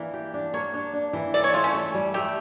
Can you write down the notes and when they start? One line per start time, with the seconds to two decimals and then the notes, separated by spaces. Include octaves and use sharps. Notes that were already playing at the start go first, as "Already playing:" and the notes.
Already playing: E3 A#3 D4
0.14 G4
0.34 D4
0.53 A#3 C#5
0.74 D4
0.93 D4
1.13 E3
1.34 A4 D5
1.44 C#5
1.54 A3 F4
1.64 C#4
1.74 A4
1.94 G3
2.14 A3 G4